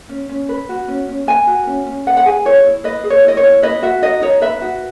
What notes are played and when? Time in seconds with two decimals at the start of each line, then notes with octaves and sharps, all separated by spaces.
0.09 C#4
0.29 C#4
0.49 B4
0.69 F#4
0.88 C#4
1.08 C#4
1.27 B4 G#5
1.47 F#4
1.67 C#4
1.86 C#4
2.06 B4 F#5
2.17 F#5
2.26 G#4 G#5
2.45 E4 C#5
2.64 E4
2.84 B4 D#5
3.04 G#4
3.10 C#5
3.24 E4 D#5
3.37 C#5
3.44 E4
3.62 B4 D#5
3.83 F#4 E5
4.02 D#4 D#5
4.21 D#4 C#5
4.41 B4 E5
4.62 F#4